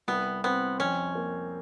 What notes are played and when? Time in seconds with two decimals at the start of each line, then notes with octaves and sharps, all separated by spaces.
0.08 C2 B3
0.44 B3 C4
0.80 F2 C#4
1.15 A#3